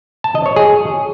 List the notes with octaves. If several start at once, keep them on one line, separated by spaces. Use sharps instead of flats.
A5
D#5
C#5
G#4